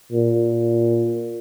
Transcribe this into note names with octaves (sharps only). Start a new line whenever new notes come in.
A#2